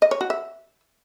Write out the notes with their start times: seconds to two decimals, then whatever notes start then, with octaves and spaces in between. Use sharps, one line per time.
0.02 D#5
0.11 C#5
0.21 F#4
0.30 E5